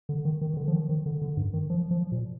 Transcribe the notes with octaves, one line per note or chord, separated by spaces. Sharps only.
D3
D#3
D#3
D#3
D3
F3
D#3
D#3
D3
D3
G2
D#3
F3
F3
A#2